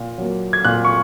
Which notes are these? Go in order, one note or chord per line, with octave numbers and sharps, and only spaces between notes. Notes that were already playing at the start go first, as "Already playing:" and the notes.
Already playing: A#2
F#3 A#3
G#6
A#2 F#6
C#6